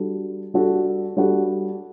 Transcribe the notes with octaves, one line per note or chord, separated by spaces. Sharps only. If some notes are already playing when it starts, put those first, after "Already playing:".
Already playing: G3 D4 F#4 A4
G3 D4 F#4 A4
G3 D4 F#4 A4